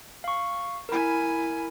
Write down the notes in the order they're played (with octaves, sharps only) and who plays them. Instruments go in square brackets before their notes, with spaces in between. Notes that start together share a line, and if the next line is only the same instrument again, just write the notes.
[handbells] F5 C#6
[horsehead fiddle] E4 G#5 [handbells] A#4 B5